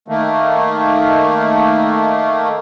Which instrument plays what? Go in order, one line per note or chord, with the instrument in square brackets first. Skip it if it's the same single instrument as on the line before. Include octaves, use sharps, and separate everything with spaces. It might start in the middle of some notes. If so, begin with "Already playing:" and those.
[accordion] D#3 A3 A#3